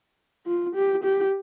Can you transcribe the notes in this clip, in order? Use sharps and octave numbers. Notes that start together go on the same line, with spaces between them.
F4
G4
G4